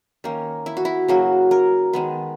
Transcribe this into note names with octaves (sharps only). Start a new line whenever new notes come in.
D#3 A#3 C#4
E4
F#4
E4
C#3 F#3 A#3 F#4
A#4
D#3 G#3 B3